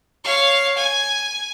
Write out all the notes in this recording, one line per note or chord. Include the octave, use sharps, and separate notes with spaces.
C#5 F5
G#5